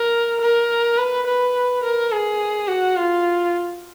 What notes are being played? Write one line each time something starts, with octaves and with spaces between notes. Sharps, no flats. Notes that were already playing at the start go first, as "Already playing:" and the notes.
Already playing: A#4
A#4
B4
B4
A#4
G#4
F#4
F4